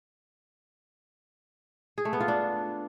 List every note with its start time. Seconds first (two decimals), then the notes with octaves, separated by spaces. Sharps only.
1.98 G#4
2.05 A3
2.13 B3
2.20 F4
2.28 D4